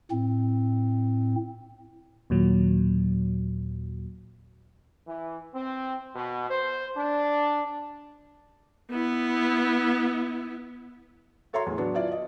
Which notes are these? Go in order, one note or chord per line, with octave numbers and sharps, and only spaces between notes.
A2 C4
D#2 A#2 F#3
E3
C4
B2
C5
D4
B3 E4
F#4 A4 C#5 E5 A#5 C6
E2 A2
F#3 B3 D4 F#4
E4 F4 D5 E5 F5
D#5